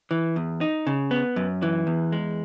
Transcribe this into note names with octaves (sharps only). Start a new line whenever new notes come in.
E3
E2
D#4
C#3
B3
F#2
E3
E2
G#3